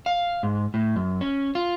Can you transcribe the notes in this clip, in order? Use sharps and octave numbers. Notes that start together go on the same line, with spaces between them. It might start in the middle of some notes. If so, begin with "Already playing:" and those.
F5
G#2
A2
F#2
C#4
F4